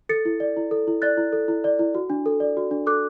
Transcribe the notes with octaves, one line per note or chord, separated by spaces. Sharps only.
A4 A6 C#7
E4
D5
E4
A4
E4
D5 F#6 A6
E4
A4
E4
D5
E4
F#4
D4
A4
D5
F#4
D4
A4 D6 F#6